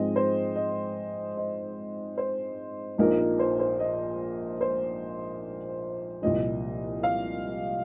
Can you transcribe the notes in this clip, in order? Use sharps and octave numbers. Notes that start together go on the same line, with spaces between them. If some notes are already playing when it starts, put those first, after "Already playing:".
Already playing: G#2 F3 G#3 C4 D#5
C5
D#5
D#5
C5
A#1 A#2 F3 A#3 D#4 A#4
A#4
C5
C5
D#5
C5
C2 A#2 F3 D#5
F5